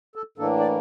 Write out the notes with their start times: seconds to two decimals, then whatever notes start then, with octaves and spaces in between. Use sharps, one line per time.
0.16 A4
0.38 A2 E3 A#3 D4 A4
0.59 D5